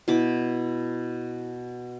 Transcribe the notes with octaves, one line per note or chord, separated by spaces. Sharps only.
B2 E4 D6